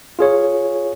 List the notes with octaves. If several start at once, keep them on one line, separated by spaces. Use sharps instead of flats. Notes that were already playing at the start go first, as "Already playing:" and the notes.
F4 G#4 C#5